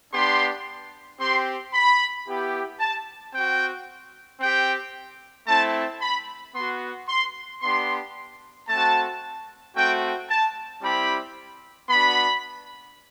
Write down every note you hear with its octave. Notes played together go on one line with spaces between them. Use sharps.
B3 D4 G4 C6
C4 G4 C6
B5
B3 E4 G4
A5
C4 F#4 G5
C4 G4 G5
A3 C4 E4 A5
B5
B3 F#4 C6
C6
B3 D4 G4 C6
A3 C4 F#4 A5
A3 C4 F#4 G5
A5
G3 C4 E4 G4 B5
B3 D4 F#4 B5